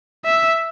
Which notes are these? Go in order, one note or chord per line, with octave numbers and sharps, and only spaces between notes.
E5